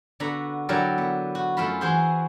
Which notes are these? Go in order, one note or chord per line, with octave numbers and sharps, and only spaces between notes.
D3 B3 F#4 A#5 B5
D3 F#3 E4 G4 A#4 D5
B3
F#4
F#2 A3 E4 F4 B5
E3 F#4 G#4 C5 C6